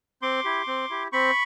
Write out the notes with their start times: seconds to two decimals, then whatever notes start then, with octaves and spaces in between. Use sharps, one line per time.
0.22 C4 C6 D6
0.45 E4 G4
0.67 C4
0.90 E4 G4
1.12 C4 B5 C#6